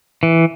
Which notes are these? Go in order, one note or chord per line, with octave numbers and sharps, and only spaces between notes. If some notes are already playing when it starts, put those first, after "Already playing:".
E3